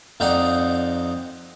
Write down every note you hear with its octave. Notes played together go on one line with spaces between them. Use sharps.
F2 D#4 D5 F#5